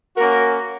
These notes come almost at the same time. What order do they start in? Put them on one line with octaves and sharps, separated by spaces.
F#4 A#4 A#3 C#4